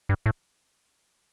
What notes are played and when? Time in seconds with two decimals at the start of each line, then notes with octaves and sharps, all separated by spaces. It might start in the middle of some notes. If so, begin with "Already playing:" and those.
0.09 G2
0.26 A2